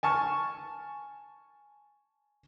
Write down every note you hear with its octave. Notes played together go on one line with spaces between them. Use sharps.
G#5 A5 C#6 F6